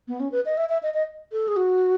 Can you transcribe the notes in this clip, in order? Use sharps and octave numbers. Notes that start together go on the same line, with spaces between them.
B3
C#4
B4
D#5
E5
E5
D#5
D#5
A4
G#4
F#4